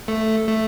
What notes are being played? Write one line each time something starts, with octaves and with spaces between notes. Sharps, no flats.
A3
A3